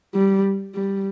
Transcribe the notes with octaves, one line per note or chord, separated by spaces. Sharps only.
G3
G3